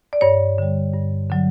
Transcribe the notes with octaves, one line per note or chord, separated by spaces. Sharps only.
D5
G2 C#5
D3 G3
G2
D3 F#3